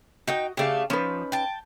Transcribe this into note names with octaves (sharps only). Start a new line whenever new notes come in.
D#4 F#4 D#5 G5
C#3 A3 G4 D5 F5
F3 C#4 D#4 B4
G5 A5